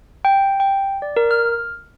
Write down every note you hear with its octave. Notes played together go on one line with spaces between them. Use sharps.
G5
G5
D5
A#4
F6